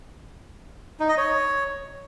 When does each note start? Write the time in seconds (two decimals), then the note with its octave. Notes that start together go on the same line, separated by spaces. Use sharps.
1.00 D#4
1.09 D#5
1.18 C#5